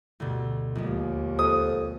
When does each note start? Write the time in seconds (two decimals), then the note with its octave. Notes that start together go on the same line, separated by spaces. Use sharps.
0.20 D2 G2 B2
0.75 A#1 D#2 G#3
1.39 F2 D#6